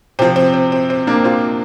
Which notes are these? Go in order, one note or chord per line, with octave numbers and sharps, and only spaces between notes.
C3 F3 C4
C4
C4
C4
C4
A#3 D4
C4 F4